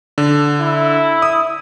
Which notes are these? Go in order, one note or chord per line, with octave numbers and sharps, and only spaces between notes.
D3
E4
D#6